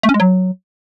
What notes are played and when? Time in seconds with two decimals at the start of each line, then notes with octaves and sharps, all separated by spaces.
0.03 A3
0.09 C#4
0.14 G#3
0.20 F#3